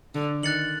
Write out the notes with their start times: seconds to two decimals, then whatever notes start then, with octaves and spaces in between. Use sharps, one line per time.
0.15 D3
0.43 D#3 F#6 A6 C#7 F#7